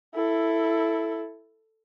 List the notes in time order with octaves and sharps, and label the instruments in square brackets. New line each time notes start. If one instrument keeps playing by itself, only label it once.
[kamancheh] E4 A4